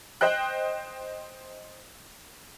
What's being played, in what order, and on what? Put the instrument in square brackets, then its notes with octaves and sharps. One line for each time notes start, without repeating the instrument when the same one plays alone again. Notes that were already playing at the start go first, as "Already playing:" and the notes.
[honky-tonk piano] C5 D#5 G5 F#6